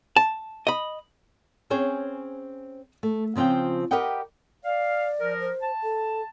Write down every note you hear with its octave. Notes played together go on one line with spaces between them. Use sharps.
A5
D#5 B5
C4 C#4 G#4 C5 C#5
A3
C#3 F3 C4 F4 G5
G4 A#4 B4 D#5 F#5 G5
D5 F5
F3 A#4
C5
A5
A4